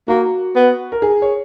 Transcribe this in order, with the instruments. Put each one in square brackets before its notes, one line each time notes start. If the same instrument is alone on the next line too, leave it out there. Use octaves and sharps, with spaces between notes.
[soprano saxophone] A#3 [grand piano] F#4
[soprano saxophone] B3
[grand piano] A#4
G#4
C#5